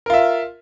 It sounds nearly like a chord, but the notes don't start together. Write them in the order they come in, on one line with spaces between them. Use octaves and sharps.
A#4 F4 E5